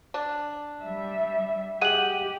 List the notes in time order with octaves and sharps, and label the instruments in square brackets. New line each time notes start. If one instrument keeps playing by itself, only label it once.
[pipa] D4
[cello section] G3 E5
[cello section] G4 [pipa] G#4 D#5 F#5 [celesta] D#7 F#7